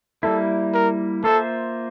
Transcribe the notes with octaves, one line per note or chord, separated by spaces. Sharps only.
G3 A#3 E4 A4
A#4
A#3 F4 A4 C5 E5